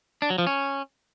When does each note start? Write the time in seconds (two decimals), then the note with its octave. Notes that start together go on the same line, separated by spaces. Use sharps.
0.22 D4
0.30 F#3
0.38 F3
0.47 C#4